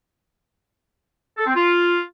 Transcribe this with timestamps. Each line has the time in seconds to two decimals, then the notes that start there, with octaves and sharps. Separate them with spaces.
1.38 A4
1.47 C4
1.56 F4